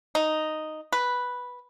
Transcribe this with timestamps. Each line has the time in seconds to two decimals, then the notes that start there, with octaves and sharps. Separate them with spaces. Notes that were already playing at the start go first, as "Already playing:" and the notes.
0.15 D#4
0.93 B4